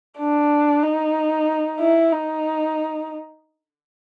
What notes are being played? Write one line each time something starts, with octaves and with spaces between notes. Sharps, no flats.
D4
D#4
E4
D#4